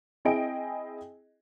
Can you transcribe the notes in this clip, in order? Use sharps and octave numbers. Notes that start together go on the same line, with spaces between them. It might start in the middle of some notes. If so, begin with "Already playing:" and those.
C4 E4 G#4 D#5 G5 D7